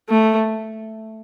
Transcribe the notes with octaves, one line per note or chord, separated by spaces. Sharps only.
A3